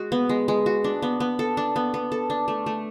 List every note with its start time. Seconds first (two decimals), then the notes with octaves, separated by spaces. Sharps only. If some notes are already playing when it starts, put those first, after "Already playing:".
Already playing: G#3 F#4
0.12 B3
0.29 G#3
0.48 G#3
0.66 F#4
0.84 D4
1.02 B3
1.20 B3
1.39 A4
1.57 D4
1.76 B3
1.94 B3
2.12 A4
2.30 D4
2.48 A3
2.66 A3